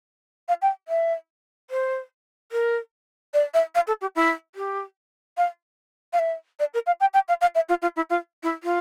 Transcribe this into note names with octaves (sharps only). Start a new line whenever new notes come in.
F5
G5
E5
C5
A#4
D5
E5
F5
A4
G4
E4
G4
F5
F5
E5
D5
A#4
F5
G5
G5
F5
F5
E5
F4
F4
E4
F4
E4
F4